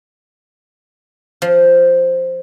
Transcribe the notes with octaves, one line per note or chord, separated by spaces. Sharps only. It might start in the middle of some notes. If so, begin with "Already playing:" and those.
F3